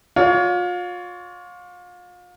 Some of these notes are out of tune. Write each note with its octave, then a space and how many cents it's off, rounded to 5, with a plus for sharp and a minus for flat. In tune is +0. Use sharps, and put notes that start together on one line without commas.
F4 +35 C#5 +40